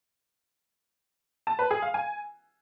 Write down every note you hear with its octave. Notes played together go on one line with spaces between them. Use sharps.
A5
B4
G#4
F5
G#5